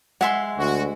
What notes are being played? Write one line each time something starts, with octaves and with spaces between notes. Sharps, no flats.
G#3 E5 F#5 C6
D2 F#4